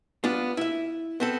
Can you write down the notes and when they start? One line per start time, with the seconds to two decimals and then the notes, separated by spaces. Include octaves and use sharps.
0.24 B3 D4 F4
0.57 E4 E5
1.20 B3 C4 A4